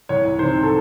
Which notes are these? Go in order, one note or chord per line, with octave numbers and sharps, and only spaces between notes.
C2 C#5
C3 D#3 C5
A4